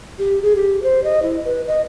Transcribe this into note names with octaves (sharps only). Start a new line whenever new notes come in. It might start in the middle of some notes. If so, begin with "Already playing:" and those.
G4
G#4
G4
C5
D#5
E4
B4
D#5